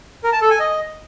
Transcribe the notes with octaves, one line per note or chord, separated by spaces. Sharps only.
A#4
A5
A4
G#5
D#5